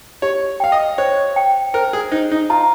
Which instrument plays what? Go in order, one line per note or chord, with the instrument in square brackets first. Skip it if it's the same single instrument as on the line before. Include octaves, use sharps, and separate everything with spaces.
[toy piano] G4 [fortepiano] C#5
[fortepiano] F5 [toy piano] G5
[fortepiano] D#5
[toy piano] C5 [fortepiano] C#5
[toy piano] G5
[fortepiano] A#4 [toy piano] C5
[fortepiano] G#4
[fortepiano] D#4 [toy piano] C5
[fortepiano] D#4
[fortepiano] F4 [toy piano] A#5